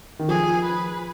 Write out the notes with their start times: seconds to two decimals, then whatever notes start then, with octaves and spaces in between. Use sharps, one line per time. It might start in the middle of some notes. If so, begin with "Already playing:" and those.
0.19 D#3
0.28 F3 G#4
0.65 B4